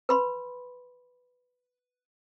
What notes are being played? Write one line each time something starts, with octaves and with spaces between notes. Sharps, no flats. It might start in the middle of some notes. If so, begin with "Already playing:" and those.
B4 B5 C6